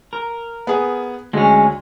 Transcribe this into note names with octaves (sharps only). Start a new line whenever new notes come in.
A#4
B3 G#4
D2 G#3 C#4